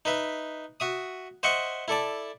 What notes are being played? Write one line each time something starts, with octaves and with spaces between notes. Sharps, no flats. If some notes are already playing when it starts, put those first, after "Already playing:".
D#4 B4 E5
F#4 E5 D#6
C5 D#5 E5 F#5 C6 C#6
E4 A4 D5 A5